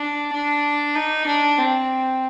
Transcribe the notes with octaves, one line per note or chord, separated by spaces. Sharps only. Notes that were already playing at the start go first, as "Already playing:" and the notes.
Already playing: D4
D4
D#4
D4
C4